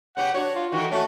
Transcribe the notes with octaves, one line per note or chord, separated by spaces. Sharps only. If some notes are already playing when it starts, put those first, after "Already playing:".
C#3 B3 G4 F#5
D4 F#4 C#5
F4
D#3 E3 A3 F#4
A3 C#4 F#4